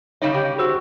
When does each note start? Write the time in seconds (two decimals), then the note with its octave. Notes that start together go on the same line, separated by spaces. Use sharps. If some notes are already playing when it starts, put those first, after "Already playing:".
0.22 C#3 G3 D#4 C#5
0.34 C#3 G4
0.58 F#4 G#4 C5 E6